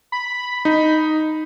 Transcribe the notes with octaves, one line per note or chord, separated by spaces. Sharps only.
B5
D#4